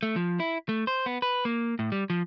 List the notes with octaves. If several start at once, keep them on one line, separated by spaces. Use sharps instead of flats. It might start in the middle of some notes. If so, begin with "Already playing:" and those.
A3
F3
E4
A3
C5
B3
B4
A#3
A2
G3
F3